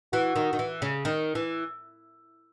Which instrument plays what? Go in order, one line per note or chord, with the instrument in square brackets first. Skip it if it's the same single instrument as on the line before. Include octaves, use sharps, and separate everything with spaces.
[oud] E3 [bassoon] F#4
[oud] D#3
D#3
E3
C#3
D#3
E3